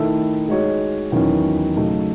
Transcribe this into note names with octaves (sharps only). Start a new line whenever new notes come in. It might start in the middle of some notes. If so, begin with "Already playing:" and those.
Already playing: D#3 A3 E4 A4 E5
G#3 D#4 F#4 C#5
E2 D#3 F#3 C#4 E4
C#3 F#3 A3 D#4